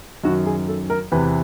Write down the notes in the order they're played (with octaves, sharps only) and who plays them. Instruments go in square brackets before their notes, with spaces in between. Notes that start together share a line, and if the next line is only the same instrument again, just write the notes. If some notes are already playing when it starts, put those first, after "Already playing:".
[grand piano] F#2 D#3 F#4
G#4
A4
A#4
E2 C3 E3 B4